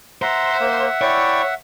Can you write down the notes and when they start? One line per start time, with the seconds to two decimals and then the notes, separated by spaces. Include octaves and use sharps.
0.22 C5 E5 F#5 A#5
0.60 A#3
1.01 E4 C#5 D5 G5